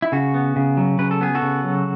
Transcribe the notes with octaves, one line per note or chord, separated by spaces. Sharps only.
E4
C#3 F#4
B3
C#3
F#3
C#3 B4
A4
B3 G#4
F#4 A4
C#3
F#3